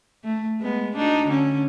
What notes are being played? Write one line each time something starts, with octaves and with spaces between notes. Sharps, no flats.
A3
G#3 B3
D4 D#4 F#4
D3 C#4